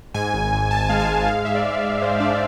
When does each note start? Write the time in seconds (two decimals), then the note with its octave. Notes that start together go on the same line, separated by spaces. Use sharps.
0.14 G#2 G#5
0.34 G#1
0.52 G#1
0.71 G#2 A5
0.89 G#3 F5
1.00 G#5
1.08 G#2
1.28 G#3 F5
1.45 G#2 E5
1.55 D5
1.64 G#3
1.84 G#3
2.02 G#3 C5
2.20 D4 D5